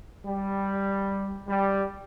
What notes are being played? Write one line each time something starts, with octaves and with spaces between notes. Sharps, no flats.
G3
G3